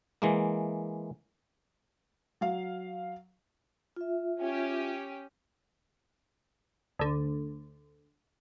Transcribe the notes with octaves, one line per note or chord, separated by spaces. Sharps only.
E3 G#3 A#3
F#3 F5
F4 E5
C#4 G4
D2 D3